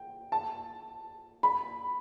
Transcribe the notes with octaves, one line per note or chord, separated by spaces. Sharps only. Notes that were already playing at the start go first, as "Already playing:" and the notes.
Already playing: G5
A5
B5